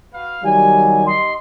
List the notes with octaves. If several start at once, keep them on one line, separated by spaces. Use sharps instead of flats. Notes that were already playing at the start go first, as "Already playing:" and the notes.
F#4 B4 F5
D#3 F#3 G3 G#5
D#4 G4 D#5 C6